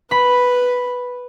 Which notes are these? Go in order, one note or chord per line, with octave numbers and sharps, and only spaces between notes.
B4 B5